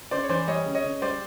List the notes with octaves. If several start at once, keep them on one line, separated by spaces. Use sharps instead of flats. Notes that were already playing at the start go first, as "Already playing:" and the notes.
C#3 C5 D5
C#5
E3 C5 D5
G3 C#5 D#5
C#3
C#5 D#5
C#3
G3 C5 D5